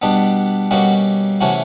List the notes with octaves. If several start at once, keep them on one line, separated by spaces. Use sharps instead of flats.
B2 G3 B3 D4
B2 G3 A#3 C#4 F#4
C3 E3 A3 C#4 F#4